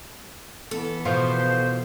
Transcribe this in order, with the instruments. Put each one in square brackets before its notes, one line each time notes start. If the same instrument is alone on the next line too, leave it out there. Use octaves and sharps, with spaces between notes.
[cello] E3 B3 [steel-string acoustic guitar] A4
[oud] B2 F3 F4 [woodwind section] C5